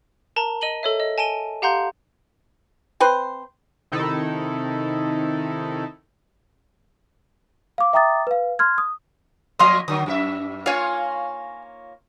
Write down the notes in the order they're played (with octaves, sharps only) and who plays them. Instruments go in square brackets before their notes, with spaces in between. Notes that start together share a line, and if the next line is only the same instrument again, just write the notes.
[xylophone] A#4 A5 A#5
D#5 D#7 F#7 G7
A4 C#5 E5
D#5
G#5 A5 D7 D#7 G7
G4 F5 F#5 A#5 C6 G6
[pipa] C4 B4 C5
[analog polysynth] C3 D#3 D#4 E4 A4
[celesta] F5 D6
E5 G5 A#5 D6 D#6 A6
B4 F5
C6 F6 G#6
D#6
[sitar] F3 A#3 D#5 [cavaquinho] F5 C6 D#6
[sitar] D3 F#3 [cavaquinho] D#6
[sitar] F#2 F#4 E5
[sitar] A#3 F4 C#5 [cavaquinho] F5 G#5